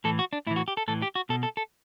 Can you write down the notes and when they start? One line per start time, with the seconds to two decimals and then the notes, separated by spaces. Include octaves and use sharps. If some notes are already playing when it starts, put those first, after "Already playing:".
0.04 A2 E3 A4
0.19 F#4
0.33 D4
0.47 A2 E4
0.51 E3
0.56 F#4
0.68 G4
0.77 A4
0.88 A2 E3 A4
1.02 G4
1.15 F#4
1.29 B2 A4
1.43 A4
1.57 A4